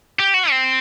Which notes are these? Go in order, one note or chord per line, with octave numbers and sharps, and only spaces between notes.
G4
F#4
C4